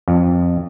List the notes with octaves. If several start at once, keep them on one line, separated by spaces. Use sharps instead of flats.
F2